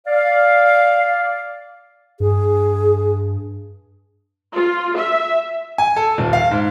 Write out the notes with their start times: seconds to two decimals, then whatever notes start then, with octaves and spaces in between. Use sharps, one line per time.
0.07 D5 F5
2.20 G2 G#4
4.54 F4
4.99 E5
5.78 G#5
5.96 A4
6.18 D#1
6.33 F5
6.51 G#2